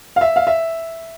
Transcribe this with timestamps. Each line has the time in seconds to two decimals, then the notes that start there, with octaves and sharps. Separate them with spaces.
0.16 F5
0.21 E5
0.36 F5
0.47 E5